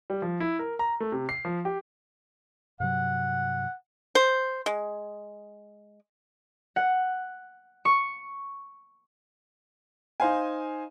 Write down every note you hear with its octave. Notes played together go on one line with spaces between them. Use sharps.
G3
F3
E4
A#4
A#5
A3
C3
C7
F3
G4
G2 C3 F#3 F#5
C5
G#3
F#5
C#6
D#4 C5 F5 G#5